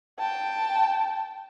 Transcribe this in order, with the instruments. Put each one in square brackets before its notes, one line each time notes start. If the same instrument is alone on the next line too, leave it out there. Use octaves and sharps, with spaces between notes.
[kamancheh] G5 A5